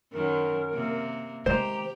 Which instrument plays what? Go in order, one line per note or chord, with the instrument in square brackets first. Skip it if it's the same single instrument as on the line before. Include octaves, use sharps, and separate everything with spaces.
[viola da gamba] F#2 D#3 [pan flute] A#4
[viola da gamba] C3 A#3
[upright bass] D#3 G#3 [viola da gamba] G4 [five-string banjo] C5 [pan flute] A#5